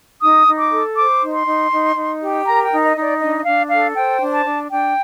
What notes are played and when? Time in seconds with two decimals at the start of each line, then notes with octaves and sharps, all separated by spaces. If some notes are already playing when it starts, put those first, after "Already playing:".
0.22 D#4 D#6
0.46 D#4
0.59 D6
0.72 A4
0.97 C5 D6
1.22 D#4
1.34 C6
1.46 D#4
1.71 D#4
1.96 D#4
2.21 G4
2.46 A#4 A#5
2.64 G5
2.71 D#4
2.84 D#5
2.96 D#4
3.02 D5
3.20 D4 D#5
3.36 D#5
3.45 D4 F5
3.70 A4 F5
3.96 C5 G5
4.21 D4
4.32 A5
4.45 D4
4.71 D4 G5